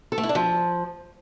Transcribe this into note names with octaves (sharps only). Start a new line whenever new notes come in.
A4
A3
E4
D4
F3